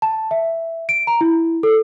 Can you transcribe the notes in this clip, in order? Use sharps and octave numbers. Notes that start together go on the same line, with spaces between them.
A5
E5
D7
A#5
E4
A4